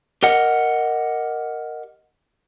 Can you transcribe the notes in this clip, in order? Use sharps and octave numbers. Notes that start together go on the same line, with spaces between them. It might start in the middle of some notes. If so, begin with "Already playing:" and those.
G4 A#4 D#5 F#5